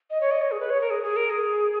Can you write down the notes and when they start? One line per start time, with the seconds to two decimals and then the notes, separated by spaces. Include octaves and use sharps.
0.10 D#5
0.21 C#5
0.31 D#5
0.41 C#5
0.51 G#4
0.60 B4
0.70 C#5
0.81 A#4
0.90 G#4
1.03 G#4
1.16 A#4
1.30 G#4